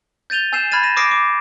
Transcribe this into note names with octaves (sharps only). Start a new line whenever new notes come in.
G6 A6 D#7 F7 G7
G#5 E6 G6 C7 E7
B5 F6 G#6 A6 D#7
A#6 D#7 E7
D6 D#6 F6 A#6 C7 D7
D6